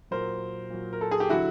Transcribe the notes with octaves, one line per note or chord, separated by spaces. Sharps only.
A#2 F#3 A#4 C5
A#2 F#3
A#4
A4
G#4
G4
D3 F#3 E4 F#4